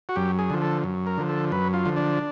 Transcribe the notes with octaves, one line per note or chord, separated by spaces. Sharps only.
F#4
F#2 G4
G#4
D3 F3
A4
F#2
A#4
D3 F3
A4
F#2 B4
F4
D3 F3
D4